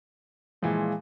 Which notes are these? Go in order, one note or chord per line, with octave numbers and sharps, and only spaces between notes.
A#2 E3 F3 G#3